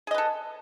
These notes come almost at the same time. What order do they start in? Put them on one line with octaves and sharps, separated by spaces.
G#4 D#5 B4 A4